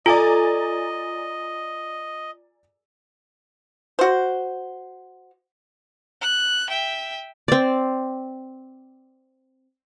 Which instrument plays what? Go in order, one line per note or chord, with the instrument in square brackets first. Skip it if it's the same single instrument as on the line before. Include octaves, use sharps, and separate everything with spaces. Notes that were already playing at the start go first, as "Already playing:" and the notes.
[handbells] F4 [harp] A4 [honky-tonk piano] D5 G#5 A#5 [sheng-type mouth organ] D#5
[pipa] F#4 C5
[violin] F#6
E5 G5
[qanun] C4 D5